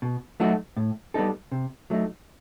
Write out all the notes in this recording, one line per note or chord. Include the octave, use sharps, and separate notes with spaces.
B2
F#3 A3 D#4 F#4
A2
G3 B3 D#4 A4
C3
F#3 A3 D#4